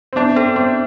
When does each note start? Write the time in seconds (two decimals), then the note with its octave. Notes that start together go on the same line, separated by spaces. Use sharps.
0.13 C4
0.16 B3 D4
0.36 C4 D4 A4
0.56 B3 C4